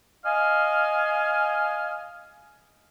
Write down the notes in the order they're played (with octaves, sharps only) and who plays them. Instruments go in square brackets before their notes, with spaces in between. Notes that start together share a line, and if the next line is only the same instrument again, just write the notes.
[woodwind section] D#5 F5 G#5 F6